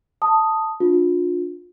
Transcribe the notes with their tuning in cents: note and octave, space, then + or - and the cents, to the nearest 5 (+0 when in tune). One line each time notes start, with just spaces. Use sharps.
A5 +5 D#6 +0
D4 +0 F4 +30